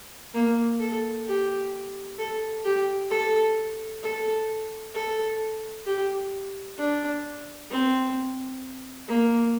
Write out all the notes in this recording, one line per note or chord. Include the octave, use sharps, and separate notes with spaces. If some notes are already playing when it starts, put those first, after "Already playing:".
A#3
A4
G4
A4
G4
A4
A4
A4
G4
D4
C4
A#3